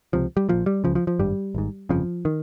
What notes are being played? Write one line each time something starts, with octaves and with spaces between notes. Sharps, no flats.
C#2 C3 F3
G3
A#1 A#2 F3
G3
C#2 C#3 F3
F3
F3
G#1 G2 G3
G#1 G#2
G1 F2 C#3 F3
D#3